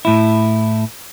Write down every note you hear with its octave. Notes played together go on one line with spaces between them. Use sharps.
A2 E4